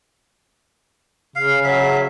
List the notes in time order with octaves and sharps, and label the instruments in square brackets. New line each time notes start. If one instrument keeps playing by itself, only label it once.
[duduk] C#3 [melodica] F5
[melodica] F#3 E5